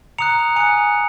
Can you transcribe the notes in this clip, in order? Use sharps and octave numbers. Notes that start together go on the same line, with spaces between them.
A#5 D#6 F#6 C#7 F7
G#5 D#6 F#6 C#7 F7